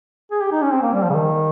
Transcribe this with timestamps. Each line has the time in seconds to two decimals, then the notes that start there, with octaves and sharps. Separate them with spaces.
0.31 G#4
0.41 G4
0.52 D#4
0.62 C#4
0.72 C4
0.82 A#3
0.93 G3
1.03 F3
1.10 C#3
1.14 D#3